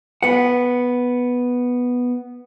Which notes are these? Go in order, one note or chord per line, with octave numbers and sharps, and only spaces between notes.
B3 F#5